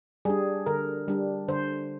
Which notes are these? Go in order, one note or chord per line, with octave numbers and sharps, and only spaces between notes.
G3 D4 G#4
D3 A#4
G3 D4
D3 C5